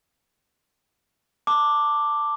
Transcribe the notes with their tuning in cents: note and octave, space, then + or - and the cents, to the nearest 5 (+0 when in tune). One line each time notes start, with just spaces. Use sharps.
A5 +15 D6 +0